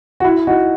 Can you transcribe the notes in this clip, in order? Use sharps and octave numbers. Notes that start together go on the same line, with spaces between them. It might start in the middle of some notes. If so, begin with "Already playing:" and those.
F#4
E4
D#4 F#4